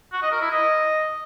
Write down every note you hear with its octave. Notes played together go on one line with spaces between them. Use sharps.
F#4
D#5
A#4
E4
D#5